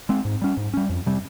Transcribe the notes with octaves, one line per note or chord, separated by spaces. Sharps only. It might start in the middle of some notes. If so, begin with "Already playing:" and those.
G#3 C4
G#2
G3 C#4
G#2
G3 C#4
F2
C3 G3 C4